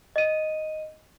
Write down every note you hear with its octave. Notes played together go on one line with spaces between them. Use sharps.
D#5 D#7